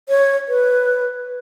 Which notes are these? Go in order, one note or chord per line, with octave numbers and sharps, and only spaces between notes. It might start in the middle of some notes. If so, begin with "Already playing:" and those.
C#5
B4